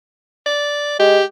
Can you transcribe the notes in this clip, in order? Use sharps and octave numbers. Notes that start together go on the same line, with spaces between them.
D5
G#3 G4